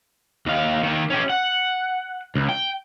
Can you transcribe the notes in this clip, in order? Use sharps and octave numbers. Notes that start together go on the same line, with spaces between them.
D#2 F5
D#3 A#3
C#4 G4
F#5
C#2
G5